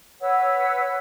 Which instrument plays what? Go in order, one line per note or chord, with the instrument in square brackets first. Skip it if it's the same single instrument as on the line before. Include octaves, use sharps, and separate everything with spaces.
[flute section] B4 C#5 F#5 E6